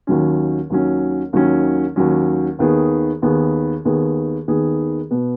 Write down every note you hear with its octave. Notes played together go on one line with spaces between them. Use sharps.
D#2 D#3 F#3 C#4
D#2 D#3 F#3 C#4
D#2 D#3 F#3 C#4
D#2 D#3 F#3 C#4
D#2 D#3 B3 G#4
D#2 D#3 B3 G#4
D#2 D#3 B3 G#4
D#2 D#3 B3 G#4
B2 B3